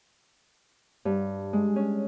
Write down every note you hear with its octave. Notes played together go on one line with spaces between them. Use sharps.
G2
G#3
C#4